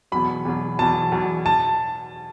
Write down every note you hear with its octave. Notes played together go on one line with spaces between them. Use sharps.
E2 B2 F#3 B5
E2 B2 F#3
E2 B2 F#3 A5
E2 B2 F#3
A5